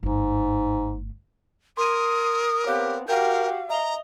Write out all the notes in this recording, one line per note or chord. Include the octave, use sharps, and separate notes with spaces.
G1 G#2 A3
A#4 C6 D#6 D#7
B3 C4 G4 C#5 F5 F#6
F#4 G4 A#4 F5 G5 G6
D#5 E5 A#5 F7 G7